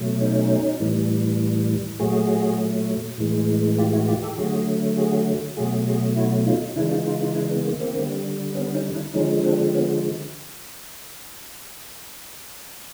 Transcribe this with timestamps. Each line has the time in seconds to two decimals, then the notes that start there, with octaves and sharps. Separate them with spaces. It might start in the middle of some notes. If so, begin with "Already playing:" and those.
Already playing: B2 F#3 A3
0.21 C#4 D#4
0.80 A2 E3 G3
2.00 A#2 F#3 A3 F#4 G#4
3.18 A2 E3 G#3
3.78 F4 G4
3.93 E4 F#4
4.08 F4 G4
4.23 G4 A4
4.38 D3 F#3 A3 F#4 G#4
4.97 F#4 G#4
5.57 B2 F#3 A3 F#4 G#4
5.87 F#4 G#4
6.16 E4 F#4
6.46 D#4 F4
6.76 C#3 E3 G#3 D4 E4
6.90 D#4 F4
7.06 D#4 F4
7.21 D#4 F4
7.35 D4 E4
7.51 B3
7.65 A#3
7.80 A#3 C4
7.95 D3 G3
8.54 B3 C#4
8.74 C#4 D#4
8.94 D4 E4
9.14 D3 F3 G#3 C#4 D#4
9.43 C4 D4
9.74 B3 C#4